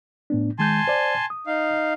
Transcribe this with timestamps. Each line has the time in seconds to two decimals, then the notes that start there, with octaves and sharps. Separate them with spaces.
0.30 A2 B3 D4
0.59 D#3 G#3 G#5 A5 C6 G6
0.88 C5 D5
1.30 D#6
1.47 D#4 F5